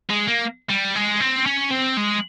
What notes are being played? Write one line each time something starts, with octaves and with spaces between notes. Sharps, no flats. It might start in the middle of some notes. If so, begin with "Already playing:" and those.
G#3
A#3
G3
G#3
C4
C#4
C4
G#3